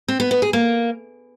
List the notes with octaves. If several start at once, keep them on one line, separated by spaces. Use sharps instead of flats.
C4
B3
B3
G#4
A#3